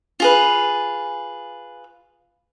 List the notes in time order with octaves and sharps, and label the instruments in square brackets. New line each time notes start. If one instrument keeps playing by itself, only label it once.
[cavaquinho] F4 G#4 B4